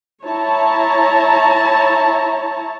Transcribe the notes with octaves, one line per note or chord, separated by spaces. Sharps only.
E4 C#5 A5 A#5